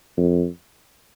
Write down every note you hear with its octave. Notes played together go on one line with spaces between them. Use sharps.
F2